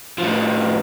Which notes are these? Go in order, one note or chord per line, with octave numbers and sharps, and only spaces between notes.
A2 F3